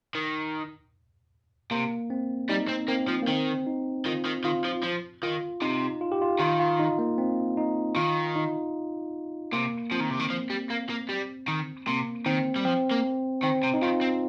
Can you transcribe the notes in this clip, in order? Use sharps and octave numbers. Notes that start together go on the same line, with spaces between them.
D#3
C3 A#3
C4
G3 D#4
C4
A#3 C4
F3
A#3
D#3 C4
D#4
D#3 F4
D#3
D#3 F4
F3
F3
D#3 F4
C3 D#4
F4
G4
F4
D#3 F4
F4
D#4
A#3
C4
D#4
D#3 F4
D#4
C3 A#3
F3 C4
D#3
C3
D#3
F3
G3
A#3
A#3
G3
D#3
C3 A#3
D#3 C4
G3
F3 C4
A#3
D#3 C4
C3
D#4
D#3 F4
C4